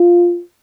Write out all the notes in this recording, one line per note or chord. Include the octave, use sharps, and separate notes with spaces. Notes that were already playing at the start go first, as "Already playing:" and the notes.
Already playing: F4